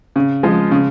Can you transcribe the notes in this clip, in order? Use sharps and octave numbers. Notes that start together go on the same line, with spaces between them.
C#3
F3 G#3
C#3